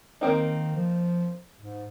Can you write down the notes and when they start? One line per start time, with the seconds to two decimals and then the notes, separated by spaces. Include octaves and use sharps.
0.21 D#3 A#3 C4 D#4
0.75 F3
1.61 G#2